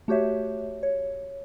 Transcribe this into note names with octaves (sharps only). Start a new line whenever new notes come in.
A3 F#4 G4 C#5 E5
C#5